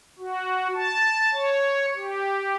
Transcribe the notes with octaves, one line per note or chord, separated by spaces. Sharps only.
F#4
A5
C#5
G4